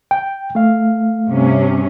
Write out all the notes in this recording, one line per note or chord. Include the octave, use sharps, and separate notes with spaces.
G5
A3 F5
G2 C3 C#4